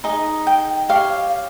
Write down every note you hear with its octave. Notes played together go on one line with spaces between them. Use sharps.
D#4 G#4 D#5
G5
G4 C#5 F5